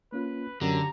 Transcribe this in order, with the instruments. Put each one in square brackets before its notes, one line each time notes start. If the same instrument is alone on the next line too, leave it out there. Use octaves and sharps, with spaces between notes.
[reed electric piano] A#3 C#4 F4 [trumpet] B4
[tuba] F#2 [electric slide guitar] D3 [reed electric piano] G4 [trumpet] A#5